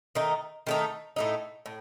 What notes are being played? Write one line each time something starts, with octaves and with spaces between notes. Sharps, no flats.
D#3 A3 D#4
D#3 A3 D#4
A2 A3 D#4
A2